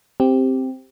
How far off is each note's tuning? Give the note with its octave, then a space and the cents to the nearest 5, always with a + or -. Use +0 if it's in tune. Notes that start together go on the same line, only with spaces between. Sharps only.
C4 +0 G4 +0